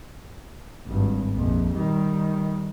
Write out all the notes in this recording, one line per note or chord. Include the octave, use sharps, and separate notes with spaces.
G#1 G2
A#1 F2
D#3 G3